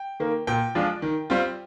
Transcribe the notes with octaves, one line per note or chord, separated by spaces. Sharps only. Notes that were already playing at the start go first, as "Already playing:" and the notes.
Already playing: G5
D#3 A#3
A#2 G5
F3 G#3 D4 F4
D#3
G3 C4 F4